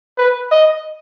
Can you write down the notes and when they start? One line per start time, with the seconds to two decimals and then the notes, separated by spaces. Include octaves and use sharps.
0.18 B4
0.52 D#5